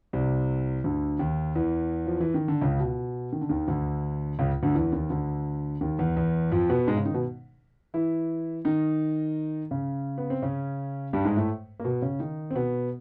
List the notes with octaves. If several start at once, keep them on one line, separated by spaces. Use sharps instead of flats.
C2 C3
D2 D3
D#2 D#3
E2 E3
F3
E3
D#3
D3
C#2 C#3
B2
D#3
D3
D#2 D#3
D2 D3
C#2 C#3
D2 D3
E2 E3
D#2 D#3
D2 D3
D#2 D#3
E2 E3
E2 E3
F2 F3
B2 B3
G#2 G#3
C#3 C#4
D#3 D#4
B2 B3
E3 E4
D#3 D#4
C#3 C#4
B3
C4
C#3 C#4
G2 G3
G#2 G#3
A2 A3
A#3
B2 B3
C#3 C#4
D#3 D#4
C4
B2 B3